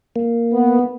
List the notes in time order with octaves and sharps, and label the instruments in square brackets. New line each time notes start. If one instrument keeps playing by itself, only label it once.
[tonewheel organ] A#3
[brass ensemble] B3